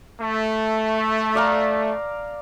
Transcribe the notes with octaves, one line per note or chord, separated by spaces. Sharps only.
A3
D5 F5 A#5